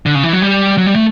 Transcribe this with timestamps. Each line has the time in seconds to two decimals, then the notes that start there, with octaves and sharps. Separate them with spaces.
0.06 D3
0.15 C#3
0.23 E3
0.33 F#3
0.42 G3
0.78 F#3
0.86 G3
0.95 A3